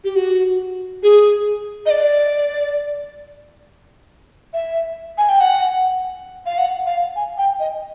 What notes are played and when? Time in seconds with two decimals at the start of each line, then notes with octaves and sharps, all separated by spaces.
0.04 G4
0.16 F#4
1.03 G#4
1.86 D#5
1.90 D5
4.54 E5
5.18 G#5
5.29 G5
5.40 F#5
6.46 F5
6.58 F#5
6.86 F5
7.16 G#5
7.38 G5
7.60 D#5